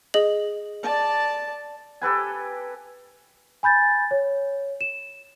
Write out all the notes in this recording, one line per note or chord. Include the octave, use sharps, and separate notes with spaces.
G#4 D#5 F#7
D5 A5
G4 A4 B4 G#5
G#5 B5 G6 A6
C#5
E7